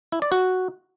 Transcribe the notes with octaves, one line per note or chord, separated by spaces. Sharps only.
E4
D5
F#4